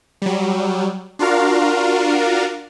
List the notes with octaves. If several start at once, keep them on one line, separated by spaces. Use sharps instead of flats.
F#3 G3
D4 F4 F#4 A#4 F5